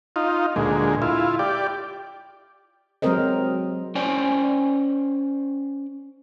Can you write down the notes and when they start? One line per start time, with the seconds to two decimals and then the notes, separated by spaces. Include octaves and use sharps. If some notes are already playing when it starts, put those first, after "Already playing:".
0.16 D#4 F4
0.56 D2 A#2 G#3
1.02 E4 F4
1.39 G4 D5
3.02 F#3 G#3 C4 A#4 C5 D#5
3.95 C#4 C5 D5 G5 G#5